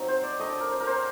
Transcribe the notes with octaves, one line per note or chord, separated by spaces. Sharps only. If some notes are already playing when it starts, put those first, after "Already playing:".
Already playing: F#3 C4 D#4
C5
D5
A3 D4 D#5
D5
A#4
C5
A#4
C5